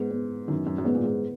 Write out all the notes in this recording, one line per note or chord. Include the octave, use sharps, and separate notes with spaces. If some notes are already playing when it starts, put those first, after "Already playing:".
Already playing: G#2 B3
B3
F#2 D#3
F#2
F#2
G#2 B3
A#2
G#2